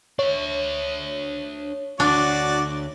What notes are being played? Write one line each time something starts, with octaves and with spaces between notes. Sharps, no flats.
D4 C#5 E5
D2 D4 F#4 D5